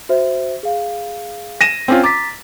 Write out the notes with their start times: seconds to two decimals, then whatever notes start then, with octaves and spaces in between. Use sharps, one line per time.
0.09 F#4 C5 E5
0.63 G#4 F5
1.61 A#6 D#7 E7
1.88 C4 C#4 F4
2.03 A#5 D6 A6 B6